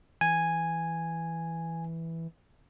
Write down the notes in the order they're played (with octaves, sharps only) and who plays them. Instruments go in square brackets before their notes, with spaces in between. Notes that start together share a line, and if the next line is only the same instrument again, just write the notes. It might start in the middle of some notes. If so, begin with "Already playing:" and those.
[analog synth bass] E3 [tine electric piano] G#5